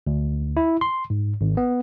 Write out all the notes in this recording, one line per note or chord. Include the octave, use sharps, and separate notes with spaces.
D2
E4
C6
G#2
G#1
B3